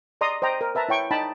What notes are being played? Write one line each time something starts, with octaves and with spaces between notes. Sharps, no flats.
D5 D#5 A#5 C6 D#6
C5 D#5 G5 A#5
A#4
B4 E5 A5 A#5
E4 C#5 G5 C#6
D#4 G5 A5 B5